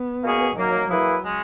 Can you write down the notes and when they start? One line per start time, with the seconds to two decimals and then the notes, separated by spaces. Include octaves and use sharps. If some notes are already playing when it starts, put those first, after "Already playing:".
Already playing: B3
0.23 B2 A#3 C#4 G#4
0.55 F#2 D#3 F#3 A#3
0.88 E3 F#3 A#3 E4 G#4 B4
1.22 C#3 G#3